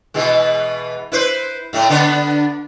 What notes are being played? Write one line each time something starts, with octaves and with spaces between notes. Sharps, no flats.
B2 E3 G#3
E4 B4 C5
A2 A3
D3 B3 D4